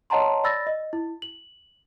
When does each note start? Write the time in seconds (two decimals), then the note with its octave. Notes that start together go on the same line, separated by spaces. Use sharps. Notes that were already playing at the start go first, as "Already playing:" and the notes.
0.10 C#5 D#5 F#5 A5 A#5 C6
0.44 D5 B5 E6 A6 A#6
0.67 D#5
0.93 E4
1.22 F#7